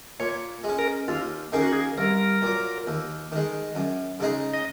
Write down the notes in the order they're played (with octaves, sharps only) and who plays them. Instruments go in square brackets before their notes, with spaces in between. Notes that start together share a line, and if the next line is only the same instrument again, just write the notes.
[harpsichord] A#2 [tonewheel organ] C#5
[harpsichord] G#3 C#4
[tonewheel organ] A#4
[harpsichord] D#2 [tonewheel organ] F4
[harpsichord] D#3 A#3 C#4 [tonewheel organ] G#4
[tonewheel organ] F#4
G#4
[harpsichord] C2 [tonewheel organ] A#4
[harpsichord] A#2 F#3
D#2
D#3 G#3
F#2
C#3 G#3 D#4 G#4
[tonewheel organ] D#5